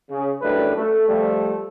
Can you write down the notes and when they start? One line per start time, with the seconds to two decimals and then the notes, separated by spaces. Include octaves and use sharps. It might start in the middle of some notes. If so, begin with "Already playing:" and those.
0.10 C#3
0.41 A1 F#2 G3 A3 D4 B4
0.76 A3
1.08 F3 G3 A3